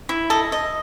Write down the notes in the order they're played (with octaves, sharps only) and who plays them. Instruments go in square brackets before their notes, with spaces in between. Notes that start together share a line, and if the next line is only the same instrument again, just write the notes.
[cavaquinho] E4
[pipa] A4 [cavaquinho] D#5
[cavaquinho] D#5